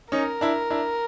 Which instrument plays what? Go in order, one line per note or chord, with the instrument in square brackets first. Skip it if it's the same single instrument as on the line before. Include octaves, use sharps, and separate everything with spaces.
[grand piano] C#4 D#4 [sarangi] A#4
[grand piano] D4 E4
D4 E4